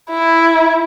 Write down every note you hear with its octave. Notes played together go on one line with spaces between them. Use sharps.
E4